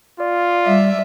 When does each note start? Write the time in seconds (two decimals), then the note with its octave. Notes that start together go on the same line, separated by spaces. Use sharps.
0.20 F4 D5
0.67 G3 E5